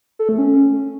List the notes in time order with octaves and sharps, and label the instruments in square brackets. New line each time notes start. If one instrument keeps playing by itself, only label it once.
[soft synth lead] A4
A3
C#4